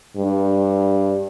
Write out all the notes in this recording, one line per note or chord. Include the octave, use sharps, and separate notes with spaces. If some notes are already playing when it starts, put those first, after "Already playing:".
G2